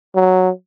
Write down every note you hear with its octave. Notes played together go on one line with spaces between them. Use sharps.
F#3